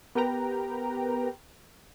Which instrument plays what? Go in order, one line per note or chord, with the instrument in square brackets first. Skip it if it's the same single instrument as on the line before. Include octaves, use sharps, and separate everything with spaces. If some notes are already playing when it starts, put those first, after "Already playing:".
[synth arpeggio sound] B3 G4 A#4 B4 G5 A#5